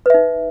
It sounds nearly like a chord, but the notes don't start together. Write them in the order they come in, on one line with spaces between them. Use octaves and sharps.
B4 E5 D#4